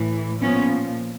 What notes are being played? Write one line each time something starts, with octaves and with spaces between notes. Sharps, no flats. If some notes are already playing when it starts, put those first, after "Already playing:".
Already playing: A2 E3
A#2 F3 B3 C#4